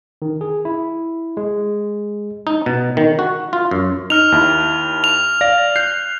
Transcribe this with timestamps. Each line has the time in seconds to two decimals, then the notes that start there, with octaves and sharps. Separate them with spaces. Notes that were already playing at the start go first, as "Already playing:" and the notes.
0.22 D#3
0.41 G#4
0.65 E4
1.37 G#3
2.47 D#4
2.66 B2
2.97 D#3
3.19 F#4
3.53 F4
3.71 F#2
4.10 D#4 F6 F7
4.32 D#2 E4
5.04 F7
5.41 D5 F5 A#6
5.76 F#6 G6 C7